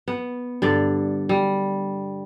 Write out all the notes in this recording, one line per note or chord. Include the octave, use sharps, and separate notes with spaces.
B3
G2 D3 D5
G3